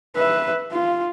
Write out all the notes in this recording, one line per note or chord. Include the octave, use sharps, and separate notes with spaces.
B4 E5
F4